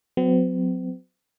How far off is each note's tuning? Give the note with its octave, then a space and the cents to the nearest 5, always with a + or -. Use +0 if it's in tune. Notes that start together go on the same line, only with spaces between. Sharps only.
F#3 -15 C4 -45